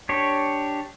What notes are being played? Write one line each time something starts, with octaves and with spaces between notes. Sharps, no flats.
D4 G4 C#5